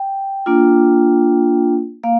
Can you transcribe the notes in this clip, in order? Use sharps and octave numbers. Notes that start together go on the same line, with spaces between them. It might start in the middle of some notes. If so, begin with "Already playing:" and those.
Already playing: G5
A#3 D4 F4
A#3 F5